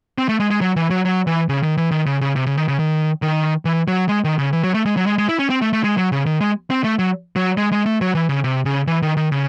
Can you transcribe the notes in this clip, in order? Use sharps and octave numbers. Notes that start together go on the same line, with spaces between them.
C4
A3
G#3
G#3
F#3
E3
F#3
F#3
E3
C#3
D#3
E3
D#3
C#3
C#3
C3
C#3
D#3
C#3
D#3
D#3
E3
F#3
G#3
D#3
C#3
E3
F#3
A3
G#3
F#3
G#3
G#3
E4
C#4
C4
A3
A3
G#3
F#3
C#3
D#3
G#3
C4
A3
F#3
F#3
G#3
G#3
A3
F#3
E3
C#3
C3
C#3
E3
D#3
D#3
C#3